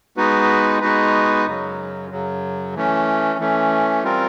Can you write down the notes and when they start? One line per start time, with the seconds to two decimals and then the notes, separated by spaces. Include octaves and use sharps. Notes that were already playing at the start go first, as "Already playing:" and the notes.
0.17 G#3 B3 D#4 F#4 B4
0.81 G#3 B3 D#4 F#4 B4
1.46 F#2 C#3 F#3
2.10 F#2 C#3 F#3
2.75 E3 A3 C#4
3.39 E3 A3 C#4
4.03 G3 C4 F4 A#4